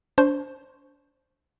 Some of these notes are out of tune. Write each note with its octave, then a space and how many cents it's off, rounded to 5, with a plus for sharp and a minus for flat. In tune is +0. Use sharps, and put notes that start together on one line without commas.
D4 -25 C5 +0 C#6 -5